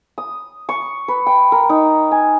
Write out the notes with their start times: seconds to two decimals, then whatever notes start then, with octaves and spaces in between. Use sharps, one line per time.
0.18 D#6
0.69 C#6
1.08 B4
1.26 G5
1.52 A#4
1.69 D#4
2.11 G#5